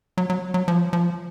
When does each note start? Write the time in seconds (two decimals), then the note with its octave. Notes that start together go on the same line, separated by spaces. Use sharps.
0.18 F#3
0.30 F#3
0.54 F#3
0.68 F3
0.93 F3